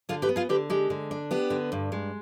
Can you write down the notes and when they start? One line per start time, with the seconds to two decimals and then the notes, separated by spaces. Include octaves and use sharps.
0.09 D3 F4 G#4
0.22 G4 B4
0.29 B3
0.36 F4 G#4
0.49 D3 G4 B4
0.70 G#3 G4
0.90 D3
1.11 D4
1.31 B3 G4
1.50 D3
1.72 G2
1.92 G#3